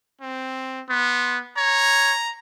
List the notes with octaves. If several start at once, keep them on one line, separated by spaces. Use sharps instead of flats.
C4
B3 C6
C#5 A#5